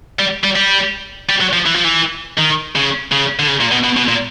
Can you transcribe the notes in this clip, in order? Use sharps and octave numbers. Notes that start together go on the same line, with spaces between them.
G3
G3
G3
G3
F#3
F3
E3
F3
E3
D#3
C#3
C#3
D3
C#3
A#2
B2
B2
B2
A#2